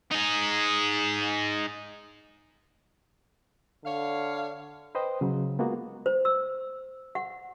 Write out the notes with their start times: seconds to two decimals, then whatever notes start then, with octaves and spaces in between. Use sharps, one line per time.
0.11 D#4 G#4
3.85 D3 C#5 F5
4.95 B4 C5 D#5 G5
5.21 C#3 F#3
5.59 G#3 A#3 B3 F4 F#4
6.06 C5
6.25 E6
7.15 F#5